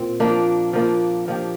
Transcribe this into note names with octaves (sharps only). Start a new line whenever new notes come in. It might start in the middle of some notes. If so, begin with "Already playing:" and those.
Already playing: A#2 C4
F3 A#3 D4
F3 A#3 D4
F3 A#3 D4 G4